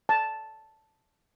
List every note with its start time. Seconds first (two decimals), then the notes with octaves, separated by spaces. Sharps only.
0.09 A5